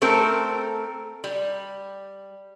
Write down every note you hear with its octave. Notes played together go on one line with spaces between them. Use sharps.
A3 C4 A4 A#4
G3